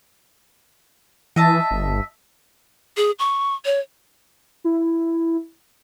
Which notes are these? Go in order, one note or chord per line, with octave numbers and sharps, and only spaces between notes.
E3 D#5 E5 A5
G1
G#4
C#6
C#5
E4